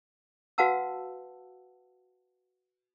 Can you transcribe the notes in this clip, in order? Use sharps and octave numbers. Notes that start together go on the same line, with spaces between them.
F#4 B4 F5 F#5 A5 E6